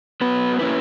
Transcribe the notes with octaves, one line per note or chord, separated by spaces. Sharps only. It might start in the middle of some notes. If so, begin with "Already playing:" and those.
F#3 B3 F#4 B4
A#3 C#4 E4 B4